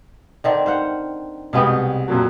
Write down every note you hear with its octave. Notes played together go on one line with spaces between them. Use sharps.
D3 D#3 C4
C5 F5 F#5
C2 B2 G#3 B3 G5 D#6
F2 A#2 F#3